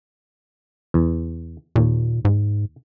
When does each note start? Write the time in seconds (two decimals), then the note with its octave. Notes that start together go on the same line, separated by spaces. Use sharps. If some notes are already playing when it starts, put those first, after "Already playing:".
0.94 E2
1.76 D#2 A#2
2.25 G#2